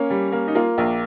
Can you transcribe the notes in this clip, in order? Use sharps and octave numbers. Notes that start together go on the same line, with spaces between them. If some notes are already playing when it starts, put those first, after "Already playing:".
Already playing: A#3 C#4 C#5
G3
A#3
D#4
A#3 F4
A#1